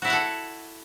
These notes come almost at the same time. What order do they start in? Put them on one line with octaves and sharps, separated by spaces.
F#4 E4 C#5 F#5 A4